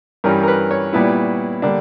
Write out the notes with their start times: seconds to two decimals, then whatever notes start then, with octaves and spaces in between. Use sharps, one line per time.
0.24 G2 E3 G3 C#4 A#4
0.43 A#4
0.48 B4
0.71 C#5
0.93 A#2 G3 B3 E4
1.62 D3 G3 A#3 D4